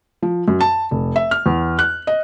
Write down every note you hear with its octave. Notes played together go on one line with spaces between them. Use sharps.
F3
F#2
A5
F1
E5
F6
E2
F#6
D#5